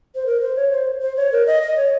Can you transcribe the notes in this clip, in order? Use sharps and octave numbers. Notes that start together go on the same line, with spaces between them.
C5
A#4
C5
C#5
C5
C5
C#5
A#4
D#5
D#5
C#5